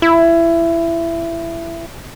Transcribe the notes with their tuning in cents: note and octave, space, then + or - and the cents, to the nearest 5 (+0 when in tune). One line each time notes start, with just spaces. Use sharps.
E4 +20